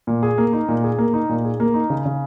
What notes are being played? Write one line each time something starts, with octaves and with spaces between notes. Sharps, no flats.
A#2
G#4
A#3
D#4
A#2
G#4
A#3
D#4
A#2
G#4
A#3
D#4
C#3
C#3